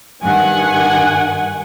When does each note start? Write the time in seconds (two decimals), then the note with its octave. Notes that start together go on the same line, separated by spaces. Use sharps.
0.22 G2 D#3 F#5 G#5